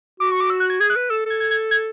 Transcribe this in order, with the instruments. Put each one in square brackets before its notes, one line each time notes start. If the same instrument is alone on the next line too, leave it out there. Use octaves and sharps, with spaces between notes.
[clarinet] F#4 [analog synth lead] D6
[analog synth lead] C#6
D6
E6
F#6
G#6
[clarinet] G#4 [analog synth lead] G#6
[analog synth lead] F#6
[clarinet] B4
[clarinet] A4 [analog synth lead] E6
[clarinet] A4 [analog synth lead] G#6
[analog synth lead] G#6
G#6
G#6